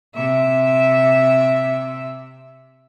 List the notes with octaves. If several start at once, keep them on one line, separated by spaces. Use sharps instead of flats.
C3 E5